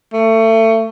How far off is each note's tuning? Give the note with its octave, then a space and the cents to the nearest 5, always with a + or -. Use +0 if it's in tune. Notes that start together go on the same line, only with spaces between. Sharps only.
A3 +30